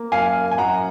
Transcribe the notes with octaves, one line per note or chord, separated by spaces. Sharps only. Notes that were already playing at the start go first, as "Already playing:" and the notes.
Already playing: A#3
F#2 F5 G#5
G#5
F#2 F#5 A#5